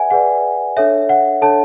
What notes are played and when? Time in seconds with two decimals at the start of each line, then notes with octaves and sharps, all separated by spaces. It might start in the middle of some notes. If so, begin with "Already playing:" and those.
Already playing: G#4 B4 D5 E5 F#5 G#5
0.11 G#4 B4 D5 F#5
0.77 D4 A4 C#5 E5
1.09 F#5
1.42 D4 A4 C#5 A5